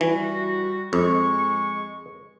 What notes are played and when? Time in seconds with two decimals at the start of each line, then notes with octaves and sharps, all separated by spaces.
0.01 E3 G3 F#4
0.93 F2 G#3 C#6